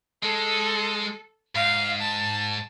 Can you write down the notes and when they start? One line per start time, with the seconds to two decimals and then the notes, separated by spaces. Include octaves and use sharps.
0.23 G#3 A4
1.55 G#2 F5
2.01 A5